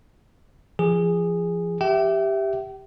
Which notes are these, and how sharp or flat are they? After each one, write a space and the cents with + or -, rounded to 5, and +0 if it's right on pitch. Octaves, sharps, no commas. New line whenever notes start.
F3 -30 G#4 -10
G4 +0 E5 +0 G5 -40